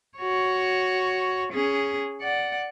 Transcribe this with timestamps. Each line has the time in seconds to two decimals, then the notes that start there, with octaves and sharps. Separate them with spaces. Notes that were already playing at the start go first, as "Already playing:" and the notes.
0.17 F#4 C#5
1.53 C#4 G#4
2.22 D5 F#5